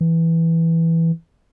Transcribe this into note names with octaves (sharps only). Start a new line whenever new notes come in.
E3